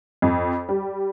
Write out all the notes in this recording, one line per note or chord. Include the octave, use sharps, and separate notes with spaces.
F2
G3